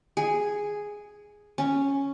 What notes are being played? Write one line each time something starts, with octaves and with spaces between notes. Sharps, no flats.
G#4
C#4